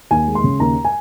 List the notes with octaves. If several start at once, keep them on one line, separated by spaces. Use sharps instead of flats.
D#2 G#5
G#3
C6
C#3
D#2 A#5
G#5